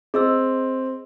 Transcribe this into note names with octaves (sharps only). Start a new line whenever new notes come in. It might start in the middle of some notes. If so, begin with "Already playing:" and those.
C4 G#4 D#5 E6